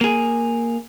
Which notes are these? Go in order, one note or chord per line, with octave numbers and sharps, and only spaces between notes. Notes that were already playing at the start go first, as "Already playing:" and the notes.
A#3 G#4